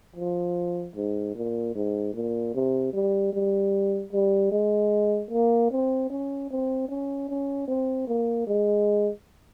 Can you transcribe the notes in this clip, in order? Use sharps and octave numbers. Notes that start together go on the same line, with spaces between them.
F3
G#2
A#2
G#2
A#2
C3
G3
G3
G3
G#3
A#3
C4
C#4
C4
C#4
C#4
C4
A#3
G#3